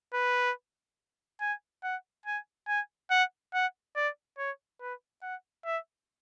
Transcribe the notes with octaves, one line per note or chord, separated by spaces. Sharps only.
B4
G#5
F#5
G#5
G#5
F#5
F#5
D5
C#5
B4
F#5
E5